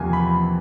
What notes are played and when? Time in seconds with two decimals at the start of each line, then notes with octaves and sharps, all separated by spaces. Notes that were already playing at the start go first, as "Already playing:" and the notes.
Already playing: E2 C3 F3 A#3 G#5
0.13 B5